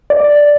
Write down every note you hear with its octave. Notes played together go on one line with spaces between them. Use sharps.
D5